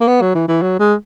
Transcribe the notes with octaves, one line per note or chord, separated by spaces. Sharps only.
A#3
B3
F#3
E3
E3
F#3
G#3